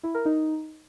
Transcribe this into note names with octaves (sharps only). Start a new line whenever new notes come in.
E4
A#4
D#4